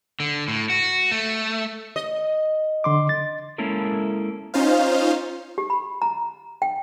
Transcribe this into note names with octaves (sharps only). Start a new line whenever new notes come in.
D3
A2
F#4
A3
D#5
D3 C6 D6
A6
G#3 A#3 C#4 E4 A4 A#4
C#4 D#4 F4 C5 F5
G4
B5
A#5
G5